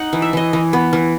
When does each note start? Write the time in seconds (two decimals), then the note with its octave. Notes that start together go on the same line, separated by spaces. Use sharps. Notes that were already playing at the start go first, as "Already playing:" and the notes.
Already playing: D#4 F#5
0.13 E3
0.22 E5
0.33 E3 D#5
0.53 E3
0.73 B3
0.93 E3